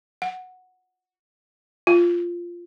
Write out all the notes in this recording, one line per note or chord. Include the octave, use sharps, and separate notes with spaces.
F#5
F4